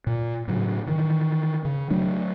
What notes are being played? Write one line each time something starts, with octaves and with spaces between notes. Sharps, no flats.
A#2
A2 C#3 F#3
D#3 E3
C#3
F#3 A3 D4